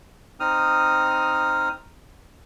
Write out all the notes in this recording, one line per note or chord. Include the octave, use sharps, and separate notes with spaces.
C4 D#4 D#6 F6